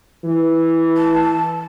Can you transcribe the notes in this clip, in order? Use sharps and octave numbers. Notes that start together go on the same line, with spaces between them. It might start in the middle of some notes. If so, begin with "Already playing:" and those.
E3
A5